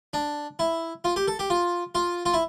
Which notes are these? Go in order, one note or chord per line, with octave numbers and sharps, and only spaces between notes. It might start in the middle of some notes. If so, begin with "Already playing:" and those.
D4
E4
F4
G4
A4
G4
F4
F4
F4
E4